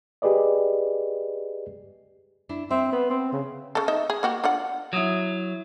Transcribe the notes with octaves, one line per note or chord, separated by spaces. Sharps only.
G4 G#4 B4 D5 D#5
D4 E4
C4 E5
B3
C4
C#3
C#3 A4
D#4 D#5 E5
G#4
A#3 F#4 G4
D4 F4 F#5
F#3 E4 D#6